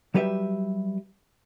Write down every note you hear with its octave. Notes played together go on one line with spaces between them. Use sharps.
F#3 G3 G4 B4 D5 E5